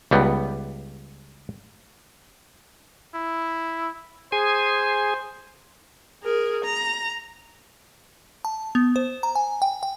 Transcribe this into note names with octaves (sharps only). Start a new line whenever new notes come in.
C#2 G3 B3
E4
G#4 C5 G#5
G#4 A#4
A#5
A5
B3
C5
A#5
G#5
G5
G5